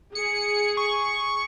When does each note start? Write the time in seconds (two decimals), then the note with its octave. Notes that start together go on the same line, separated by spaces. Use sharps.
0.15 G#4 C#7
0.77 C#6